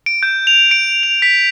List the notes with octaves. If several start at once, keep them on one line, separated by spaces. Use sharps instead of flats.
D7
G6
F7
D7
F7
B6